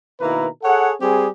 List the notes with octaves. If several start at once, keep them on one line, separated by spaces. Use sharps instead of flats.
B2 D#3 A#3 E4 B4 A#5
G#4 A4 C#5 F#5
G3 C4 G4 G#4